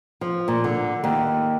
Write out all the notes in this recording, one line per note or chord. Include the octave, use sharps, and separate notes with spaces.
F3
A#2
D3
D#2